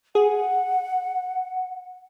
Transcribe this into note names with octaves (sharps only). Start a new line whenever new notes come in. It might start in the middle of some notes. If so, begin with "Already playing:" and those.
G#4 F#5